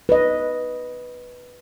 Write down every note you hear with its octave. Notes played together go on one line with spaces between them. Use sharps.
B4 D#5